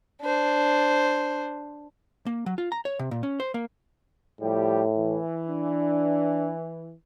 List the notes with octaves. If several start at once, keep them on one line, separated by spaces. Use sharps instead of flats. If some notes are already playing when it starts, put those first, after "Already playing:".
D4 C5
A#3
F#3
F4
A#5
C#5
C3
A#2
C#4
C5
A#3
A2 F3 G3 G4
E3
D4